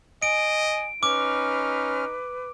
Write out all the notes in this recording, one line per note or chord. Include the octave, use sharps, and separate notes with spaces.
D#5 G#5 D7
C#4 D#4 B4 D6 F6